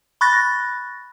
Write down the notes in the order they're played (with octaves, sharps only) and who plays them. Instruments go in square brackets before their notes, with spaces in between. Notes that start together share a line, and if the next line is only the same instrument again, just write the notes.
[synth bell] B5 C#6 F#6 A6 A#6